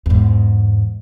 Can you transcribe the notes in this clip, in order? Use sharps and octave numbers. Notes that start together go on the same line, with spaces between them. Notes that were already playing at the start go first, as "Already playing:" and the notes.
E2 G#2